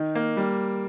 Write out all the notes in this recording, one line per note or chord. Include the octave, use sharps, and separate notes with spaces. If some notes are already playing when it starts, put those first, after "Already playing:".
Already playing: D#3 D#4
A#3
G3